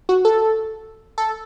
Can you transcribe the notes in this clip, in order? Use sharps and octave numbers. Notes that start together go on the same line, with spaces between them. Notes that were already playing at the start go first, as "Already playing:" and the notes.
F#4
A4
A4